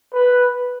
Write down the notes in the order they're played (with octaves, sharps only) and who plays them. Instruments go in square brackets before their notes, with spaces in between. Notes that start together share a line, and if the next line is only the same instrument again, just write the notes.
[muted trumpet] B4